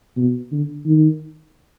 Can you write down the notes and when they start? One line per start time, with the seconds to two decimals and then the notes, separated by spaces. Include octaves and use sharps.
0.17 B2
0.52 D3
0.86 D#3